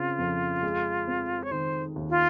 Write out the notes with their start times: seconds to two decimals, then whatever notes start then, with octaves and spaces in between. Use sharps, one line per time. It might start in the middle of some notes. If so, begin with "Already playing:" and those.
Already playing: C#3 C4 F4
0.19 F2
0.63 G#3
1.07 C4
1.43 C#5
1.51 D#3 C5
1.96 D#2
2.10 F4